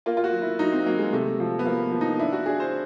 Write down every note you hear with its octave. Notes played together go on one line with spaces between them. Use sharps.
A#3 F4
F4
F#4
F#3
E4
F#3 D#4
C4
F#3 A#3
G#3
C3 A3
F3
B3
F3 A#3
F3
D#4
D4 E4
F#4
D4 G#4
C5